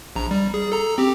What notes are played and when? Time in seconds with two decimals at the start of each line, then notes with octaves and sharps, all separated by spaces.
0.16 A#1 A#5
0.31 G3
0.54 G#4
0.72 A4 A#5
0.98 C4 G4